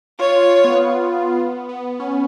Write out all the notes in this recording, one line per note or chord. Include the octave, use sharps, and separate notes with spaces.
F4 C#5
F4
F4
B3
B3
B3
C#4